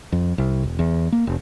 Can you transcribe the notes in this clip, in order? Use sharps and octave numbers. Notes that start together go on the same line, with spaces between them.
F2
C2
E1
E2
A#3
F1